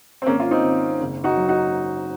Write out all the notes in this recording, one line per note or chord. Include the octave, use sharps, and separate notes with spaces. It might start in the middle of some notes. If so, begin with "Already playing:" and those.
C4
G#1 A#3 C#4
F4
C4 D#4
G#1
F#1
D#4 F#4
F#3
D#4 F#4